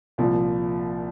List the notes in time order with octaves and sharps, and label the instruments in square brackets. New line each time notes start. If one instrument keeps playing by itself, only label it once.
[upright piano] C2 A#2 F3